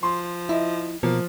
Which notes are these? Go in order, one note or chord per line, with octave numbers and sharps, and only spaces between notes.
F3 C6
E4 D#5 E5
B2 F3 A#3